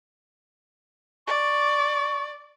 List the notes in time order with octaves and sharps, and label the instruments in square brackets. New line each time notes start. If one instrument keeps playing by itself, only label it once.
[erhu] D5 [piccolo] C#6